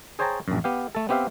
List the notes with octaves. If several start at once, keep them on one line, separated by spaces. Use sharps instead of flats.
G#4 C5 C#5 G5 A5 A#5
A#1 F#2
B3 G4 F5
A3 A4
B3 C4 G4 E5 F5